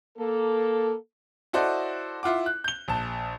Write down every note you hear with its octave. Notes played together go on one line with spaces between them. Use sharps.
A#3 A4
E4 F#4 A4 C5 D5 D#5
E4 F4 F#5 D6
F#6
G6 G7
A#1 A5